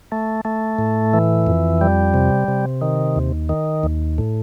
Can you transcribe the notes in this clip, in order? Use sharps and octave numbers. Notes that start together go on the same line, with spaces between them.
A3
A3
A2
E3
F2
G3
C3
C3
D#3
D#2
D#3
D#2
A2